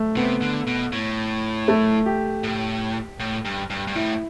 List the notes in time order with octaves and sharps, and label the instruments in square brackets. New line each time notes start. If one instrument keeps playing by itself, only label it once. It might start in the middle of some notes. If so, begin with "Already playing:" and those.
Already playing: [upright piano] A3
[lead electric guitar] C3 [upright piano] B3
[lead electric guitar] D3
B2
A2
[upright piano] A3
G4
[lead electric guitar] A2
A2
G2
G2
G2
[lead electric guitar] A2 [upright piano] E4